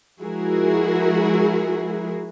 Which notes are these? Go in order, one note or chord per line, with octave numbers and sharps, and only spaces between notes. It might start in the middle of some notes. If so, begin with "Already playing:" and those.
F3 G#3 E4 F#4 G#4 A#4